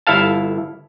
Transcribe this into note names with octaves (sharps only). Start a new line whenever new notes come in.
G1 E4 A4 F5 A5